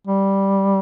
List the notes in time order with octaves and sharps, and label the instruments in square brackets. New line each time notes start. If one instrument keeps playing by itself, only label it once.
[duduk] G3